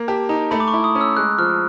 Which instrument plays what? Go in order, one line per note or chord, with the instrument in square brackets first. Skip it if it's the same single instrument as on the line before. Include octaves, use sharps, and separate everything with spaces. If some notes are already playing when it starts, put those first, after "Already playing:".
Already playing: [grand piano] A#3
[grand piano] G4 [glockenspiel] A5
[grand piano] D#4 [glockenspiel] A#5
[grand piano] A3 [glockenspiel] B5
[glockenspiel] D6
C#6
[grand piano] E4
[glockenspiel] D#6
[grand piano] C#4
[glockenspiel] E6
[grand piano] G#3 [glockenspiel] F#6
[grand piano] F3 [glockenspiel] F6